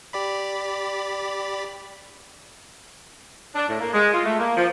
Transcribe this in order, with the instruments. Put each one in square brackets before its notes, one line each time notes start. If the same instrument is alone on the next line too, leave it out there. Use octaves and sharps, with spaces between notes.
[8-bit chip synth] G4 D5 B5
[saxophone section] D4
A2
A#3
G#3
F4
A3
A#3
F3